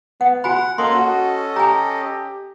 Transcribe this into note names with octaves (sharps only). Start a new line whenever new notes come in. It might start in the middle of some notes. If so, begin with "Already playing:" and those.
B3 F#5
F#4 F#5 G#5 B5
A#3 C#4 A4 D#5 C6
F#4
G4 G#5 A#5